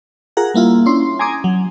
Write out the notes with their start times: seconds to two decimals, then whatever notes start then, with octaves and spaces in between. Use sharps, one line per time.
0.37 F4 G#4 A#4 F#5 A#5
0.54 G3 A#3 E4 F4
0.86 C#4 D4 E4 C6
1.19 G#5 A#5 C6 D6 D#6 G#6
1.44 F#3